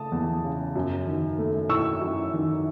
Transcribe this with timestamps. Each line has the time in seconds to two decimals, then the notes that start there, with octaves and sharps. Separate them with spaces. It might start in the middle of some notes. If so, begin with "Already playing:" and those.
Already playing: C#3 A3 A5 D#6
0.12 E2
0.44 C#3
0.76 F#2
1.07 D#3
1.38 A3
1.69 E4 C#6 E6
2.01 F#2
2.33 D#3